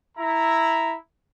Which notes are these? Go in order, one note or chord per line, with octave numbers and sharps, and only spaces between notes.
E4 A#5